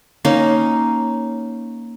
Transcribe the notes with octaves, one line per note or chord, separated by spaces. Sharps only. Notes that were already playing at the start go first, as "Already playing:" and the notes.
A#3 C#4 D#4